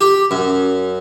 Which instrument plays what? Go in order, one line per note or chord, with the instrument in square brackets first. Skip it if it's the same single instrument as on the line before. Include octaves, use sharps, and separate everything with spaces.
[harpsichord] G4
F#2